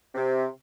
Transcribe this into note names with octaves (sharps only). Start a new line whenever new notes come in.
C3